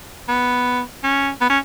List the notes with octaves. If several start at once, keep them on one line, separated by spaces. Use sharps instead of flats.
B3
C#4
B3
C#4